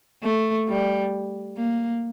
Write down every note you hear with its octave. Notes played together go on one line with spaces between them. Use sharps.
A3
G3
A#3